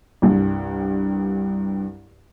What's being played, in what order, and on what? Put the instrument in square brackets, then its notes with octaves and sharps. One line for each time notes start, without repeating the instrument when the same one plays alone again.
[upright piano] C2 G2